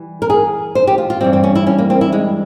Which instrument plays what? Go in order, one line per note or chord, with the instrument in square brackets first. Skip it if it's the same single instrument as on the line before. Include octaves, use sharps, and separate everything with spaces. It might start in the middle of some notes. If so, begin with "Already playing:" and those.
Already playing: [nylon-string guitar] E3 G3
A#4
G#4
C5
G4
F4
F4
G2 E3 G3 C4
C4
C#4
E4
C#4
A#3
C4
E4
G#3